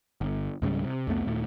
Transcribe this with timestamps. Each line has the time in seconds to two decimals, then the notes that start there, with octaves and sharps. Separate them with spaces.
0.21 G1
0.62 C#2 G#2 C#3 G3
0.84 C3
1.07 C2 F2 A3 B3
1.26 D#2 A#2 A3